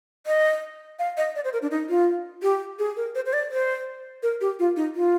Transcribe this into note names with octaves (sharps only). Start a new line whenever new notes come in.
D#5
F5
D#5
D5
C5
A#4
D4
D#4
F4
G4
G#4
A#4
C5
C5
D5
C5
A#4
G4
F4
D#4
F4